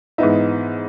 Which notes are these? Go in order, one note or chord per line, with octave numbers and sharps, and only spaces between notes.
G#2 E3 B3 D#4 E5